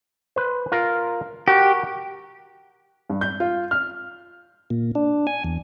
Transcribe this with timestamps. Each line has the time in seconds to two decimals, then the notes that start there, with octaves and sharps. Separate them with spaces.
0.36 B4 C5
0.72 F4 A#4 A#5
1.48 F#4 G4 A#4
3.09 G2
3.21 G6
3.40 F4
3.71 F6
4.70 A#2
4.95 D4
5.27 G#5
5.44 E2